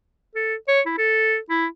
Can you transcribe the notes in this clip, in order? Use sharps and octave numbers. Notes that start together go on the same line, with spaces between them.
A4
C#5
E4
A4
E4